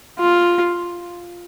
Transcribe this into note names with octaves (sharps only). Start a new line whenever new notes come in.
F4